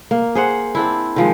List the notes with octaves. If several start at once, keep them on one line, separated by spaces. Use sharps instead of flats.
A#3
G#4 C5 F#5
C4 D4 E4
D#3 F3 G#3